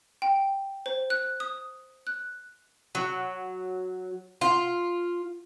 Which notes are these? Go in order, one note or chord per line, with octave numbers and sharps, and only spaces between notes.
G5
C5
F#6
D#6
F#6
F#3
F4